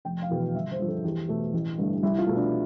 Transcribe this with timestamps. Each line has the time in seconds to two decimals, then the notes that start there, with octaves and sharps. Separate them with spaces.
0.05 F1 G5
0.22 F5
0.30 E2 B2
0.55 G1 E5
0.72 C5
0.79 G2 F3
0.88 A4
1.04 E2 G4
1.28 B2 A3
1.53 A1
1.78 G2 D3 A3
2.03 C2 E4
2.19 F4
2.27 B2 A3
2.36 D4